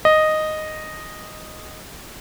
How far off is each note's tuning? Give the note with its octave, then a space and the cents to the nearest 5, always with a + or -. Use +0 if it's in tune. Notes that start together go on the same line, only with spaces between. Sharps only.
D#5 -5